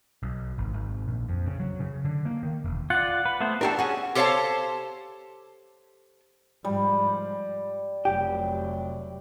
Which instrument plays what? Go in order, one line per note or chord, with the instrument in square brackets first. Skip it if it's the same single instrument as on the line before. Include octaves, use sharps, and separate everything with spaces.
[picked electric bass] B1
G#1
G#1
A#1
F2
C#3
F#3
C#3
D3
A#3
D#3
E1
[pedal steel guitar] F4 D5 [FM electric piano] F#5
[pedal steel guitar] B4
A3 B3 C5
[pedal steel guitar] D4 A4 [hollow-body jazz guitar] F#4 G4 A#4
[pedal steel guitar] C#4 F#4 [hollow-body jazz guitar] G#4 F#5
[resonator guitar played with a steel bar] G4 A4 C5 C#5 F5 A5
[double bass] G#2 F3 [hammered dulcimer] G3
[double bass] F1 F#3 [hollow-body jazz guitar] G4